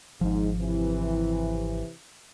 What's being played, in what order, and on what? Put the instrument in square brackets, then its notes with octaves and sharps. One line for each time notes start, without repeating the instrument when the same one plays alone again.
[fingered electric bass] G#1 F3 [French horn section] G#2 D#4
[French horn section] C3 E3